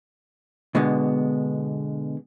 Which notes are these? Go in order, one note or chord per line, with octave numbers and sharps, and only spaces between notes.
B2 D3 G#3 B3